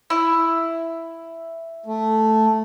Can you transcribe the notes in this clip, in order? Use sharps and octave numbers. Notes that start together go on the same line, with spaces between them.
E4
A3